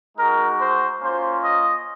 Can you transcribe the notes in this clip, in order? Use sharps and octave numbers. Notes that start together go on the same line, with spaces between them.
G#3 D#4 F#4 A#4
C5
A#3 C#4 F4 C5
D#5